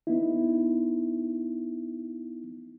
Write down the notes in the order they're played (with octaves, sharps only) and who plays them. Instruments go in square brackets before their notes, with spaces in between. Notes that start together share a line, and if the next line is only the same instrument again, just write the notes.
[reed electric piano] B3 D#4 E4